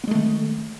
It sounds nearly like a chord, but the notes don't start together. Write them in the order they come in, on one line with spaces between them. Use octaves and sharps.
B3 G#3 A3 D#3